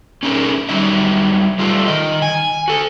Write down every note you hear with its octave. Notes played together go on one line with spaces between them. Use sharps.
C#4 D#4 E4 G#4 A#4
F#3 G3 D#4 E5
G3 A3 F4
D#3 D#5
G#5
F#4 A4